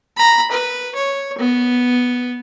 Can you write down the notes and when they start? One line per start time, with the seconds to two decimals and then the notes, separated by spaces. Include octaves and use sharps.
0.17 A#5 B5
0.51 B4
0.95 C#5
1.38 B3